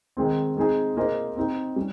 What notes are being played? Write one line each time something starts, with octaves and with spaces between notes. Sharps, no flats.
D#3 G#3 C4
G#3 C4 D#4 G#4
A#3 F4 G#4 C5 D#5
C4 D#4 G4
G3 C#4